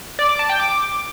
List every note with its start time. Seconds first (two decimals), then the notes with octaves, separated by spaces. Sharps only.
0.19 D5
0.29 D6
0.39 A5
0.49 G5
0.60 D6